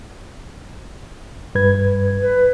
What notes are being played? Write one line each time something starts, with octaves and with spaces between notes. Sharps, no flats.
G2 B4 G#6
B4